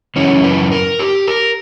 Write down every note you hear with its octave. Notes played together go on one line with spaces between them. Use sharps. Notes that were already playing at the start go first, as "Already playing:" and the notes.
F#2 C#3 E3 C#4
B4
A#4
G4
A#4